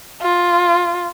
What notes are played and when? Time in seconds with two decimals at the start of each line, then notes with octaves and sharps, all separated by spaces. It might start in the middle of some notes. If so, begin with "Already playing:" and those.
0.22 F4